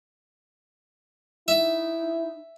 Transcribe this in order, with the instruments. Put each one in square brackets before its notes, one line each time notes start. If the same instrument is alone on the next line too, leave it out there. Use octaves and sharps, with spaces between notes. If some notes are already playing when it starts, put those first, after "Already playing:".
[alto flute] D#4 [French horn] E4 [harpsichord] E5